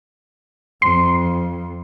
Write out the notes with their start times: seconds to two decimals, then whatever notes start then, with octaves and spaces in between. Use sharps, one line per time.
0.82 F2 C6